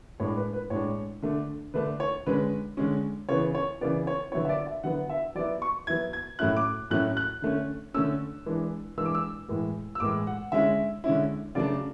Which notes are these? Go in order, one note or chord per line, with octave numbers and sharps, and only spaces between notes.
A2 G#3 D4 C#5
B4
B4
A2 G#3 D4 C#5
D3 A3 D4
D3 A3 D4 B4
C#5
D3 G#3 C#4 B4
D3 G#3 C#4
C#3 E3 B3 C#5
C#5
C#3 E3 B3 D5
C#5
D3 F#3 B3 E4 C#5
E5
D5
E5
D3 F#3 B3 E4 F#5
E5
F#3 B3 E4 D5
C#6
F#3 B3 E4 G#6
G#6
A2 F#3 A3 C#4 E4 F#6
D6
A2 F#3 A3 C#4 E4 F#6
F#6
D3 A3 C#4
D3 A3 C#4 E6
E3 G#3 D4
E3 G#3 D4 E6
D6
E6
A2 E3 G#3
E6
A2 E3 G#3 D6
F#5
D3 G#3 C#4 E4 E5
D3 G#3 C#4 E4
C#3 F#3 A3 D4 D5